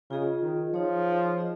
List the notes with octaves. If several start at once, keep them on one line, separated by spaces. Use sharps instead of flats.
C#3 F4 G#4 D#5
D#3
F3 D#4 G#4 C#5
F4 G#4 D#5